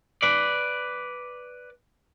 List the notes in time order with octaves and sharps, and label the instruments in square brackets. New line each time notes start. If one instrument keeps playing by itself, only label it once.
[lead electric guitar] B4 D5